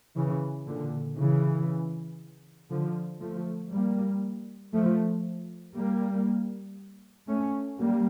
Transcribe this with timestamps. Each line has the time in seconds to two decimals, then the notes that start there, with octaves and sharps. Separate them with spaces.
0.16 C#3 E3
0.67 A#2 D3
1.17 C#3 E3
2.70 D3 F3
3.21 F3 A3
3.72 G3 A#3
4.73 F3 A3
5.75 G3 A#3
7.28 A3 C#4
7.79 G3 A#3